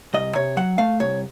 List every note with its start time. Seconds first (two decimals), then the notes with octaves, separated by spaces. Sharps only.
0.14 C2 D#5
0.35 C3 C#5
0.57 F#3 F#5
0.78 A3 F5
1.00 C2 C#5